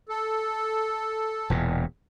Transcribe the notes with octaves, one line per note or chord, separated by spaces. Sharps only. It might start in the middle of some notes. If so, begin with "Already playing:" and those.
A4
E1 E2 A#2